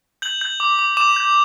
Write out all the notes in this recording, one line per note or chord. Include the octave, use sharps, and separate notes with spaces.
G6 F#7
G6
D6
D6
D6 E7
G6